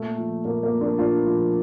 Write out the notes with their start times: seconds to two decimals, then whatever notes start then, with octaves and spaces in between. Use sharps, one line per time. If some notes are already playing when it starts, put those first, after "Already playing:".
Already playing: A#2 A3
0.18 F3
0.45 A#2 A#3
0.63 A#3
0.71 F3
0.81 A#3 D4
0.98 A#2 D4 F4
1.26 F3